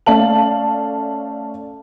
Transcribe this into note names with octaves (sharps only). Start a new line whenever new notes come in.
A3 C#4 D5 F5 A5 F#7